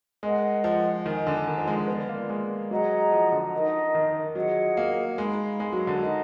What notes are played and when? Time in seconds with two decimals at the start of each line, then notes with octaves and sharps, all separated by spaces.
0.23 G#3 A#4 D#5 F#5
0.64 F3
1.05 D#3 A#4 D#5 G#5
1.27 D3
1.47 D#3
1.58 F3
1.67 G#3
1.88 B3 F4 A#4 D5
2.09 A#3
2.30 G#3
2.70 F#3 G#4 D#5 F#5 A#5
3.12 F3
3.32 D3
3.53 D#4 A#4 D#5
3.95 D#3
4.35 F#3 F4 G#4 D#5 F#5
4.77 A#3
5.18 G#3 D#4 A#4 F5 B5
5.60 G#3
5.73 F#3
5.87 D3
6.01 D#4 A#4 D#5